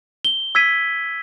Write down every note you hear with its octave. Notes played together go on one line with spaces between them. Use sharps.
G7
E6 G#6 B6 D#7